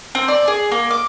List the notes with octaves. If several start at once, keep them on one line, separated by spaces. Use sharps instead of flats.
C4
D5
G#4
A#3
D6